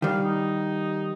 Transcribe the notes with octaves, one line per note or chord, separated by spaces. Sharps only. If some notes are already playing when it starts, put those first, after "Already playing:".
D#3 G3 F5
D#4